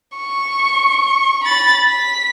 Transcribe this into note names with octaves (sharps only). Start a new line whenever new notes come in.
C#6
B5 A6
B6